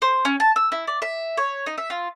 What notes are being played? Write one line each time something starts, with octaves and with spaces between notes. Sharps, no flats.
C5
C#4
A5
E6
E4
D5
E5
C#5
D#4
E5
F4